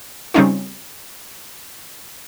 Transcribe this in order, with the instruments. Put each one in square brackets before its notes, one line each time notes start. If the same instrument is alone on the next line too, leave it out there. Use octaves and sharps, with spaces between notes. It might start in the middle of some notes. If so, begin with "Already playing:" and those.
[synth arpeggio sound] C#3 G3 C4 C#4 D#4 F4